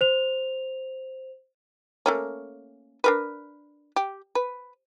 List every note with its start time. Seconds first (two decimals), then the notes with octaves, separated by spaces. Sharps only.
0.01 C5 F7
2.06 A3 A#3 C#4
3.04 D4 A#4 B4
3.96 G4
4.35 B4